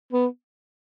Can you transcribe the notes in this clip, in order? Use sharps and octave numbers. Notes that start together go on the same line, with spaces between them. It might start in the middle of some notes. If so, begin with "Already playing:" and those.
B3